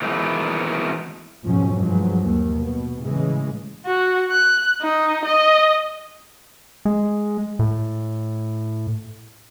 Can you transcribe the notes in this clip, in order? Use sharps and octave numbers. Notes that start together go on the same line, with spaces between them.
B2 D#3 E3 G#3 A3
F2 G#2 B2 F3 F#3 C#4
G2 F3 F#3 G#3
D#2
B2
A2 C#3 E3 G#3
F#4
F#6
D#4
D#5
G#3
A2